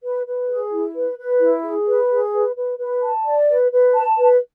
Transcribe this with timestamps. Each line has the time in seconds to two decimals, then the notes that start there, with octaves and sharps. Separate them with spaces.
0.02 B4
0.26 B4
0.49 G#4
0.72 E4
0.95 B4
1.18 B4
1.41 E4
1.64 G#4
1.87 B4
2.10 G#4
2.33 B4
2.56 B4
2.79 B4
3.02 A5
3.25 D5
3.48 B4
3.71 B4
3.94 A5
4.17 B4